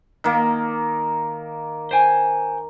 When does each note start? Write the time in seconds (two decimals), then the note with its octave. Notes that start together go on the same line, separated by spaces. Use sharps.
0.24 D#3 A#3
1.91 C5 G5 G#5